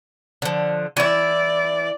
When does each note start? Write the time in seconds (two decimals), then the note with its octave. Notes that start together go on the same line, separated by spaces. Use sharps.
0.42 D3 F3
0.97 E3 D5 E5